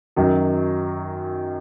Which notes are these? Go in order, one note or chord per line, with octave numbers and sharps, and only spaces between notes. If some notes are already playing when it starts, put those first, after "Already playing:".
F#2 D#3 F#3